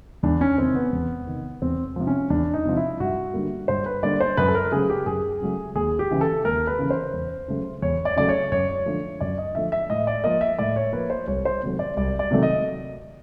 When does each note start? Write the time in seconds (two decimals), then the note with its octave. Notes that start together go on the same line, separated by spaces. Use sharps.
0.23 E2 D4
0.41 C#4
0.58 C3 D#3 C4
0.75 B3
0.93 E2
1.27 C3 D#3
1.62 E2 C4
1.96 C3 F3
2.07 C#4
2.30 E2 D4
2.54 D#4
2.65 C3 F3
2.76 E4
3.00 G2 F#4
3.34 D3 G3 A#3
3.68 G2 C5
3.86 B4
4.03 D3 G3 A#3 D5
4.20 C5
4.37 F#2 B4
4.48 A4
4.55 A#4
4.72 C#3 F#3 A3 G#4
4.90 G4
5.06 F#2 G#4
5.41 C#3 F#3 A3
5.75 D#2 G#4
5.99 G4
6.11 C#3 E3
6.21 A4
6.45 D#2 A#4
6.67 B4
6.79 C#3 E3
6.90 C5
7.13 E2
7.48 C#3 F#3 A3
7.82 E2 C#5
8.05 D5
8.17 C#3 F#3 A3 D5
8.29 C#5
8.52 F#2 C#5
8.86 D3 F3 A3
9.21 F#2 D5
9.38 D#5
9.55 D3 F3 A3 E5
9.72 E5
9.90 A2 D#5
10.07 D5
10.24 F3 A#3 D#5
10.41 E5
10.59 A2 D5
10.76 C#5
10.93 F3 A#3 B4
11.10 C5
11.27 C2 C#5
11.45 C5
11.63 C3 D#3 F#3 A3
11.79 D5
11.97 C2 D5
12.19 D5
12.31 C3 D#3 F#3 A3
12.43 D#5